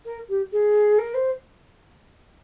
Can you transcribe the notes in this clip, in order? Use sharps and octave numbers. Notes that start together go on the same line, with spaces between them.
A#4
G4
G#4
A#4
C5